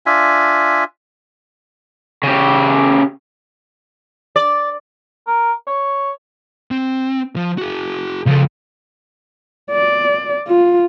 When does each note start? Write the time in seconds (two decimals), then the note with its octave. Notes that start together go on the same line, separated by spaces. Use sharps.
0.06 D4 F4 E5 G#5
2.23 C#3 G4
4.36 D5
5.27 A#4
5.67 C#5
6.71 C4
7.36 F3
7.58 F#4 G#4
8.27 C#2 F3 A4
9.72 D5
10.48 F4